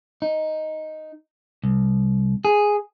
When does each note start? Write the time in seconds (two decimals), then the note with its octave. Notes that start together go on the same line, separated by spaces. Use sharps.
0.22 D#4
1.64 C2
2.45 G#4